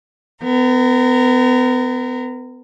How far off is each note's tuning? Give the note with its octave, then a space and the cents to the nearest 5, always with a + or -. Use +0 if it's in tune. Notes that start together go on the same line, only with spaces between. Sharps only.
B3 +35 A#4 -15